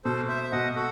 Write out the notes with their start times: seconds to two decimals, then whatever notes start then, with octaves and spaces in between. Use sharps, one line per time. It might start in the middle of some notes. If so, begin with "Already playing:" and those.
0.04 B2 A4 C5
0.29 C5 E5
0.44 E5
0.52 B2 D#5 F#5
0.76 F#4 A4